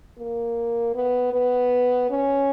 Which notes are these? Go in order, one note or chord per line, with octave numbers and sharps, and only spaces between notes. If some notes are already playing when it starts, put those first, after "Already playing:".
A#3
B3
B3
C#4